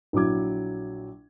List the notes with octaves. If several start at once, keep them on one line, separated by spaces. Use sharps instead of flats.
A#1 F#3 E4 D6 G#6